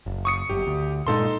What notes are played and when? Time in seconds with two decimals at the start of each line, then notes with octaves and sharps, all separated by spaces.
0.06 F#1
0.25 C#6 D#6 C#7
0.49 G1 F#2 G4
0.67 D2
1.07 G2 A#2 G#3 D#4 A4 C6